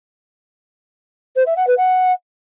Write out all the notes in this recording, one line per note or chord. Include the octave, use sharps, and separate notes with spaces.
C5
E5
F#5
B4
F#5